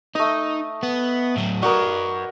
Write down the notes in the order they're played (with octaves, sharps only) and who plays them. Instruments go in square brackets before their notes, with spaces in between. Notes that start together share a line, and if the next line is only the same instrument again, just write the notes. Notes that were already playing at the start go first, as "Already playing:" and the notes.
[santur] A3 D#5 [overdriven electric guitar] D#4
[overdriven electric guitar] B3
A2 F#3
[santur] F#4 A#4 D#6 [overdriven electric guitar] B4 D5